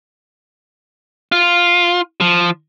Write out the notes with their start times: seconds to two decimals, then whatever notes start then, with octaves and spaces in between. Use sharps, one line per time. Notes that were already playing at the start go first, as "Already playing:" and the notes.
1.32 F4
2.21 F3